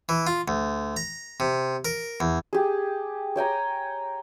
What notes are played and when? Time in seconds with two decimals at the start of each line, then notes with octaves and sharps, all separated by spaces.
0.09 E3
0.27 F4
0.48 D2
0.97 A#5
1.40 C3
1.85 A#4
2.20 E2
2.53 G4 G#4
3.36 C#5 G5 G#5 A#5